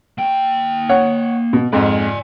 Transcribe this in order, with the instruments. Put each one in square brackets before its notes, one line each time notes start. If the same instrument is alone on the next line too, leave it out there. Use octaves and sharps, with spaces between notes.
[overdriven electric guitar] A#3 G5
[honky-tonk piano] C#5 F#5
B2
[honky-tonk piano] F2 G#2 [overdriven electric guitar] D5 G#5